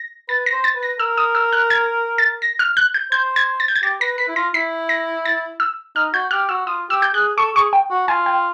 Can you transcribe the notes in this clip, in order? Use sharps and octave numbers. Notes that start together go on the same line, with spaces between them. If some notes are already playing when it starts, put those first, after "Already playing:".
Already playing: A#6
B4 A6
A#6
C5
A6
B4
A#6
A#4 E6
D#6
E6
F#6
G#6
A6
A#6
F6
F#6
G6
C5 G6
G#6
A6
G6
G#6
G4 A6
B4 A#6
B4 B6
E4
F4 A#6
E4 B6
A#6
A6
E6
D#4 F6
F#4 G6
G4 F6
F#4 E6
F4 D#6
G4 E6
G6
G#4 F#6
A4 C#6
G#4 C#6
G5
F#4
F4 G#5
G5